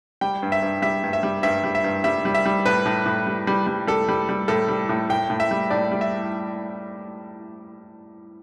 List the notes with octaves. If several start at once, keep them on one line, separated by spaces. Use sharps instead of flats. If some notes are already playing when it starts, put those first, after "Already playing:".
G3 G5
G2
E5
G2
G3 E5
G2
E5
G3
G2 E5
G3
E5
G2
G3 E5
G3
E5
G3
A2 B4
A2
A2
G3
G3
G3
G3 A4
G3
G3
A2 A4
G3
A2
A2 G5
A2
E5
G3
A2 D5
G3
E5